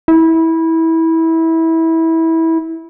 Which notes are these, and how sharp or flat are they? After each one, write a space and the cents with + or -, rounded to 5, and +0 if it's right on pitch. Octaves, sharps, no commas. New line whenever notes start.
E4 -20